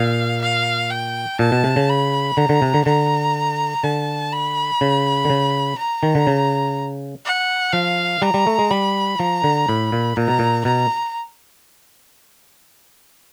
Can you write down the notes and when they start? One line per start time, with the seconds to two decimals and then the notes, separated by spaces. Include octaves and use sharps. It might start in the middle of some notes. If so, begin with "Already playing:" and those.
Already playing: A#2 F5
0.42 F5
0.90 G5
1.39 A#2 A5
1.52 B2
1.64 C3
1.76 C#3
1.89 B5
2.37 D3 A#5
2.49 D3
2.62 C3
2.74 D3
2.85 D3 A#5
3.83 D3 A5
4.33 B5
4.81 C#3
5.25 D3
5.30 C#3
5.78 A#5
6.03 D#3
6.15 D3
6.27 C#3
7.25 F#5
7.73 F3 F5
8.22 G3 A#5
8.34 G3
8.47 A3
8.59 G#3
8.71 G3 B5
9.19 F3 A#5
9.44 D3
9.68 A2 B5
9.92 A#2
10.16 A#2 A#5
10.28 B2
10.39 A#2
10.65 B2 A#5